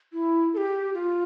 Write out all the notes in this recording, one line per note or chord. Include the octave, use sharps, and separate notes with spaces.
E4
A4
G4
F4